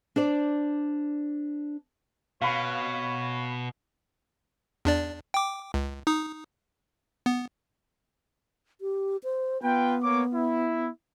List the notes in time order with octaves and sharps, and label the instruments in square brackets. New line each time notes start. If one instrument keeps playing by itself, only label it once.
[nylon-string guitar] D4 C5 D5
[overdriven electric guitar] B2 [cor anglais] C#5 [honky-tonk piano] F5 B5
[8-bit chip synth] E2 D4 D5
G5 D6
C#2
D#4 D#6
B3
[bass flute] G4
C5
[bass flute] B3 [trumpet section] F4 B4 G5
[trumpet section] A#3 C#5 D6
E4